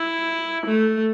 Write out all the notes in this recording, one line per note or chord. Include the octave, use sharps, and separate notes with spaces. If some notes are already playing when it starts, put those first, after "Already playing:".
Already playing: E4
A3